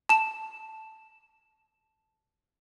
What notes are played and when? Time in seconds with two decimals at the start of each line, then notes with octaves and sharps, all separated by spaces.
0.09 A5 E7